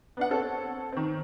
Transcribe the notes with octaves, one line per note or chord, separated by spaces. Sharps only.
B3 D4 F#5
C4 A4 C#5
D#3 C4